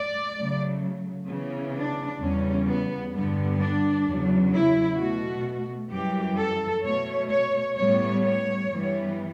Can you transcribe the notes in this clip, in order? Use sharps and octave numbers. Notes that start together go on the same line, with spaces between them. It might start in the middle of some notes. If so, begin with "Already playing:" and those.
Already playing: D5
C#3 F#3 A3
C#3 E3 B3
D4
E2 C#3 G3 C#4
B3
G2 D3 G3 B3
D4
E2 C#3 F#3
E4
B2 A3 F#4
F#2 E3 G3 G4
A4
B2 A3 C#5
C#5
A2 G3 B3 C#5
C#5
G2 E3 G3 B3